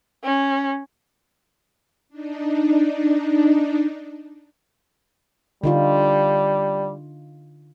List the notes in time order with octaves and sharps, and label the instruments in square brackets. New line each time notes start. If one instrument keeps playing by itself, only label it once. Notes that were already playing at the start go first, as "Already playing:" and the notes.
[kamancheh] C#4
[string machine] D4 D#4
[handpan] D3 D#4 F4 [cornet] G3